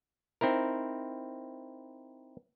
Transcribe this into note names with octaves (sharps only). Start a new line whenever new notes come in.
C4 D#4 E4 A#4